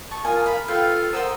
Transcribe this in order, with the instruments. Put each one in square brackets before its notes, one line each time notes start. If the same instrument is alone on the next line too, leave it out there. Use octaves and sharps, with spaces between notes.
[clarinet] A5 [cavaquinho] C#6
[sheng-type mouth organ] F4 D#6 [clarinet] A#4 [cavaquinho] G#5
[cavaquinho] F5 [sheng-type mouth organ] B5
[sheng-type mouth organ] F4 F5 [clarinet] A4 [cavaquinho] B4 G5
[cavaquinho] A#4 F#5 C6 [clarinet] C5 [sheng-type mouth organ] D#6 E6